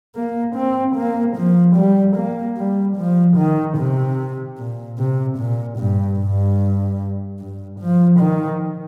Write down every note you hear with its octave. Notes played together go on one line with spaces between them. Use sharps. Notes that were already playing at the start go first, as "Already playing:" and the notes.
A#3
C4
A#3
F3
G3
A#3
G3
F3
D#3
C3
A#2
C3
A#2
G2
G2
G2
F3
D#3